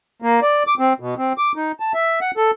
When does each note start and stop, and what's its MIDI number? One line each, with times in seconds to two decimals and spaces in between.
0.22 0.40 58
0.42 0.63 74
0.67 0.74 86
0.79 0.93 60
1.00 1.15 47
1.18 1.33 60
1.38 1.52 86
1.56 1.72 63
1.80 1.92 81
1.94 2.19 76
2.21 2.31 78
2.37 2.51 69